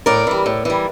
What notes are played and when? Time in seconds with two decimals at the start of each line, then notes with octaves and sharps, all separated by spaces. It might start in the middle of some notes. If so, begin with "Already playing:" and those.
0.06 A2 A#4 D5
0.27 E3 G3
0.46 A2
0.65 E3 G3